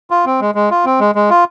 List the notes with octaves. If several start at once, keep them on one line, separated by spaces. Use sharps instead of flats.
F4
C4
G#3
G#3
F4
C4
G#3
G#3
F4